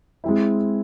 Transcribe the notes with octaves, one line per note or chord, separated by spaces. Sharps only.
G#3 C4 E4